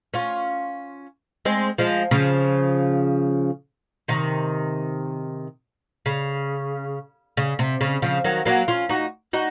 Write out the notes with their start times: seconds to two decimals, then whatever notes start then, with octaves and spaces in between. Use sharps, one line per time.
0.14 C#4 F4
1.45 G#3 C4
1.78 F3 G#3
2.11 C#3 F3
4.08 C3 D#3
6.06 C#3
7.37 C#3
7.59 C3
7.81 C#3
8.02 C#3 F3
8.24 D#3 F#3
8.46 F#3 A#3
8.68 C#4 F4
8.89 D#4 F#4
9.33 D#4 F#4